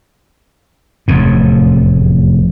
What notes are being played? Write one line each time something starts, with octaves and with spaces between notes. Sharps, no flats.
F1 E2 A2